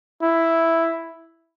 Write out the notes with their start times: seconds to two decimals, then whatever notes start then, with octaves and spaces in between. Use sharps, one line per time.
0.22 E4